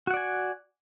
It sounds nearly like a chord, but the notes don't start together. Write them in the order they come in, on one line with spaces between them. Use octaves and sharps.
F#4 F#5 D5 G#5